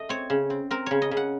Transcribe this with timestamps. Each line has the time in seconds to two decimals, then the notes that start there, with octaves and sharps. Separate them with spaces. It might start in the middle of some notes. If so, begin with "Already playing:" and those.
Already playing: A3 D#5
0.09 C4 C#5
0.30 C#3
0.50 C4
0.71 C4 A#4
0.86 C#3 C#5
1.02 D#5
1.11 C#3
1.17 F#5